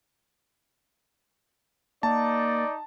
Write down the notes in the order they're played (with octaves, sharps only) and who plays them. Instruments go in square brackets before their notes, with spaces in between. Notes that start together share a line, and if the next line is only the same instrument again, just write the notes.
[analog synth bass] A#3 [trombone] D#4 [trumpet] D5 [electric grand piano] A5